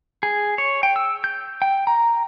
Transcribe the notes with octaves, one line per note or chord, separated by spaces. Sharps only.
G#4
C#5
G5
E6
G6
G5
A#5